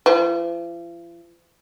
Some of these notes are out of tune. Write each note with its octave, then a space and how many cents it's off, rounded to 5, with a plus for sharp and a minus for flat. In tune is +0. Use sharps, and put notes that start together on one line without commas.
F3 -45